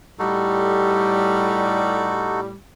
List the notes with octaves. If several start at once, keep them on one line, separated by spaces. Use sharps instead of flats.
A2 G3 D#4 F#4 A4